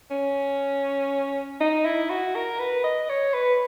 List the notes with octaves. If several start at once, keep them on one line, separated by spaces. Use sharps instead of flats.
C#4
D#4
E4
F#4
A#4
B4
D#5
C#5
B4